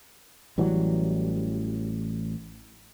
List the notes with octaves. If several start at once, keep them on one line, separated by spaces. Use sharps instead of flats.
A1 E3 F#3 G3